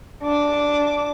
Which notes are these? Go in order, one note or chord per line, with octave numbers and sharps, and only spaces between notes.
D4 D6